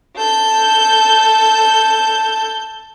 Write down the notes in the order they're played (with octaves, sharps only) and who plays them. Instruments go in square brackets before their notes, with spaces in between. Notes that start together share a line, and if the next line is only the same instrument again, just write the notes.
[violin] A4 G6